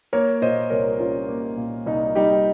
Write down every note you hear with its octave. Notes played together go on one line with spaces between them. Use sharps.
A#3 A#4 C#5
A#2 C5 D#5
C2 A#4 C#5
G3 C#4 F4
A#3
A#2
C2 D#4
G3 D#4 G4